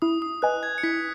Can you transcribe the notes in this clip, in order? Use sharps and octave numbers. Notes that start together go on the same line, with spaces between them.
E4 D#6
D#6
B4 D#5 G#5 F#6
G#6
C#7
E4 B6